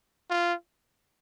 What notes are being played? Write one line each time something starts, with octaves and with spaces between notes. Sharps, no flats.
F4